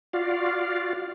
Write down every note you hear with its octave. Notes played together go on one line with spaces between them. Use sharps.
F4 F#4 D5 F5